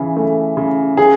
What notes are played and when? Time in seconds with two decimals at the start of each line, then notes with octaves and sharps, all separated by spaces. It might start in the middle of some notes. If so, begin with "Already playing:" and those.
Already playing: C#3 E3
0.17 A3
0.57 C#3
0.97 C#3 G#4